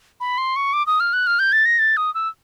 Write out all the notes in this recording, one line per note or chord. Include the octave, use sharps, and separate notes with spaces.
B5
C6
C#6
D6
D#6
F6
F#6
F6
G6
A6
A#6
A6
D#6
E6